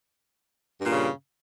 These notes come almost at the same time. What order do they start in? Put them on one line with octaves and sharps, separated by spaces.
G2 A#2 C#3